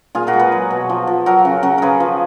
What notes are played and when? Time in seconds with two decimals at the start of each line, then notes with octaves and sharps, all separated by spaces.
0.15 A#2 F4 G#4
0.27 F#4 A#4
0.33 G#3
0.39 G#4 B4
0.52 F#3
0.70 B2
0.90 F3
1.07 F3
1.26 F#3 F#4 A#4
1.45 C#3
1.63 C#3 F#4 A#4
1.78 C#3 G#4 A#4 B4
2.00 F3